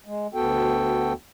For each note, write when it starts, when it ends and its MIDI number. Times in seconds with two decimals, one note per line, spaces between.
0.06 0.27 56
0.34 1.13 38
0.34 1.13 59
0.34 1.13 66
0.34 1.13 69
0.34 1.13 79